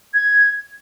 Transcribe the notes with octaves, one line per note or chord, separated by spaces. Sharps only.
G#6